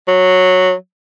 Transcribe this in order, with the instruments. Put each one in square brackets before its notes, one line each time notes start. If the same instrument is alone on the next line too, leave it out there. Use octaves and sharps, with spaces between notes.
[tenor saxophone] F#3